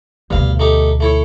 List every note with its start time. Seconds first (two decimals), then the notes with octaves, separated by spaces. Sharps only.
0.30 D2 G2 B2 F5
0.59 A3 D#4 G4
1.00 A3 E4 C#5